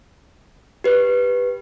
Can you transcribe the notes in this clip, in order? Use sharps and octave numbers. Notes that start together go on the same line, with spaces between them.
G4 B4